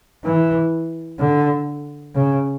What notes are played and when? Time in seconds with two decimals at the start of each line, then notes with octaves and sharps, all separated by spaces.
0.24 E3
1.19 D3
2.15 C#3